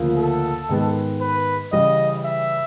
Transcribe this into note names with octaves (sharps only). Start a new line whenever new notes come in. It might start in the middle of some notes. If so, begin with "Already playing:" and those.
Already playing: D2 C#3 F3 A#3
A4
G#2 D#3 G#3 B3
B4
C#3 E3 G3 D#5
E5